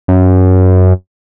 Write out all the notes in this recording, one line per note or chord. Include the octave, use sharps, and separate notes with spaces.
F#2